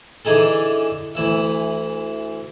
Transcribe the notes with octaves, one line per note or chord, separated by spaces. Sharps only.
D3 E3 D#4 G#4 A4
D2 E3 E5